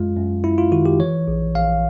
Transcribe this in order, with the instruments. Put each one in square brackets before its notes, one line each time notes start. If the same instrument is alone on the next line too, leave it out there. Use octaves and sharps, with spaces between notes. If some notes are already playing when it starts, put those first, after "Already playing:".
Already playing: [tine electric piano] F#2 G#3 F4
F#2
F#2 E4
F4
D#3 F#4
G4
E3 C#5
A#1
A#1 F5